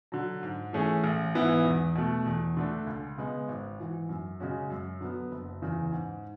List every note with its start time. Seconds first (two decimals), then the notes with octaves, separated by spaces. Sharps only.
0.12 D3 F#3
0.43 G#2
0.73 E3 A3 C#4 G#4
1.04 A1
1.34 G#2 E3 B3 E4
1.65 E2
1.95 B2 A3
2.26 E2
2.57 D3 A3 D4
2.87 C#2
3.17 C#3 G#3 B3
3.48 G#1
3.78 G#2 E3
4.09 F#2
4.40 C#3 G#3 C#4 F#4
4.70 F#2
5.00 D3 F#3 B3
5.32 F#1
5.62 E2 C#3 E3
5.92 G#2